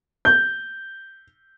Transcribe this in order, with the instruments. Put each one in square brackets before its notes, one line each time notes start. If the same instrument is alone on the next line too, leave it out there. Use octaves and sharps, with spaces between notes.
[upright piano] G6